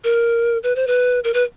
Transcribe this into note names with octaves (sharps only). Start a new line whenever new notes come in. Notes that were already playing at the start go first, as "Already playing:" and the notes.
A#4
B4
C5
B4
A#4
B4